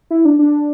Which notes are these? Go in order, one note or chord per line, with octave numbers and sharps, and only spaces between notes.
E4
D4
D4